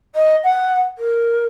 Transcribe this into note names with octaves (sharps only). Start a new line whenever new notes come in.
D#5
F#5
A#4